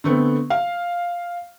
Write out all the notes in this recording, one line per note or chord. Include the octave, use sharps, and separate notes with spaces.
D3 A3 B3 C4
F5